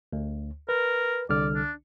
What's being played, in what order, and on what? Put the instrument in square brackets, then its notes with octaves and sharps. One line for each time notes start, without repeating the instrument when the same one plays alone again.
[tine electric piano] D2
[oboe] A#4 [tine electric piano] B4
[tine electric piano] C2 D3 F6 [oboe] D5
[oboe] D4